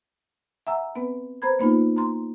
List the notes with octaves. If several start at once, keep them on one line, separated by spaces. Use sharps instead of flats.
E5 F#5 G#5 A#5 E6
B3 C4 B4
B4 C5 A#5 B5 G#6
A#3 B3 D#4 F4
A#5 C6